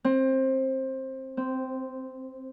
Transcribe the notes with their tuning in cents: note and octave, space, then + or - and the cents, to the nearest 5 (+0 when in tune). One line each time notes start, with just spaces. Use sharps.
C4 +20
C4 -10